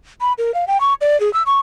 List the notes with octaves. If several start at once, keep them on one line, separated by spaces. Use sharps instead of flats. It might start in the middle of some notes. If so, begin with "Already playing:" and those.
B5
A#4
F5
G5
C#6
D5
G#4
E6
C#6